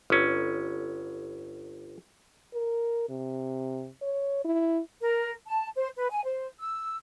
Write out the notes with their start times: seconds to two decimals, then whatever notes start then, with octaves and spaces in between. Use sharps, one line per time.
0.10 G1 C#4
2.53 A#4
3.09 C3
4.02 C#5
4.45 E4
5.01 A#4
5.46 A5
5.76 C5
5.97 B4
6.11 G#5
6.24 C5
6.59 E6